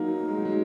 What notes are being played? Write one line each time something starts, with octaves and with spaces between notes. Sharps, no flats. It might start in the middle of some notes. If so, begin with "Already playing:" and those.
Already playing: F#3 A#3 D#4
A#3
G#3
F#3
G#3